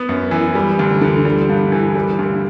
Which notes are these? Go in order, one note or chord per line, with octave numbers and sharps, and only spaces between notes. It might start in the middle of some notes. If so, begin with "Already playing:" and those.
Already playing: B3
F#2
E3
G3
D2
D3
G3
G2
E3
G3
D2